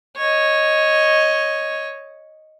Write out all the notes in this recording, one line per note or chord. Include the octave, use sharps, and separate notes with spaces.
C#5 D#5